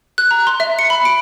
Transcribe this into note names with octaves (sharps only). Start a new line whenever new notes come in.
F#6
A#5
C6
E5
C#7
B5
D7